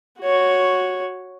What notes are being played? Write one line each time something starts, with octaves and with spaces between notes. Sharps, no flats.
F#4 C#5